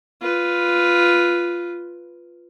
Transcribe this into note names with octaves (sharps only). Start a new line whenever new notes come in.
F4 B4